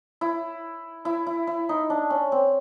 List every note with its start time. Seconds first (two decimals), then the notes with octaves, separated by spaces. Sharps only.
0.21 E4
1.05 E4
1.27 E4
1.47 E4
1.69 D#4
1.90 D4
2.10 C#4
2.32 C4